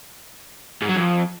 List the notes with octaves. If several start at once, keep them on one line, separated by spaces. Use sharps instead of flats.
G#2
F#3
F2